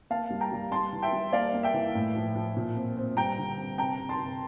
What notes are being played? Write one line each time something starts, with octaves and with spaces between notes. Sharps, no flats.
A#3 F5 A5
G3
G5 A#5
G3
G3 A5 C6
E3
E5 G5
G3
A#3 D5 F5
A#3
E5 G5
E3
A2
F3
F3
A#2
C4
C4
G3 G5 A#5
D3
C4
C3 G5 A#5
C3
A5 C6
C3